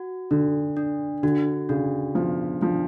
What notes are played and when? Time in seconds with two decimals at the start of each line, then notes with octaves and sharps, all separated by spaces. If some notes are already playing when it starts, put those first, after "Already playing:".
Already playing: F#4
0.31 D3 D4
0.77 D4
1.23 D3 F#4
1.69 C#3 D4
2.15 F3 B3
2.61 F3 D4